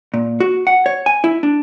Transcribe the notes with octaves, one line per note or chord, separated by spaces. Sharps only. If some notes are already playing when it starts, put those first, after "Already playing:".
A#2
F#4
F#5
C#5
G#5
E4
D4